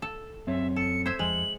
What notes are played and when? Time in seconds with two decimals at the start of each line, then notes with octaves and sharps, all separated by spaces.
0.02 A4
0.47 F#2 C4 C#5 E5
0.76 A4 C#7
1.06 C5 E5 G#6
1.19 F2 G#3 F#7